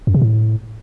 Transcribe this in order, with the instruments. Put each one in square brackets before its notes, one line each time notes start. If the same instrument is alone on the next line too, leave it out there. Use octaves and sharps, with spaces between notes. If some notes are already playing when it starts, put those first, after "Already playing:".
[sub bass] F#2
C3
A2